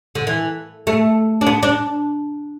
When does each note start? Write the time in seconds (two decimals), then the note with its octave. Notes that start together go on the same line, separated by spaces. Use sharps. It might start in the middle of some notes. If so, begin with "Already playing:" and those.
0.15 D3
0.27 E3
0.87 A3
1.41 D4
1.47 B3
1.63 D4